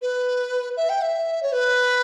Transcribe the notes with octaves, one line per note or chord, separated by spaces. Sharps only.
B4
E5
G5
E5
C#5
B4